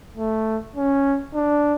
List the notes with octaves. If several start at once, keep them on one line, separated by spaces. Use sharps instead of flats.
A3
C#4
D4